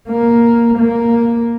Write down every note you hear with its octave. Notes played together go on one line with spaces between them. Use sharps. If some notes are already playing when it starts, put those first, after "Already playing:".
A#3
A#3